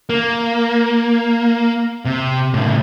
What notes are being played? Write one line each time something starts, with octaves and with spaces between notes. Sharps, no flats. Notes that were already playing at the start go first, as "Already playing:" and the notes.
A#3
C3
A2 C#3